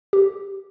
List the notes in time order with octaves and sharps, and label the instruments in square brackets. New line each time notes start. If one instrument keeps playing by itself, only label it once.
[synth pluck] G4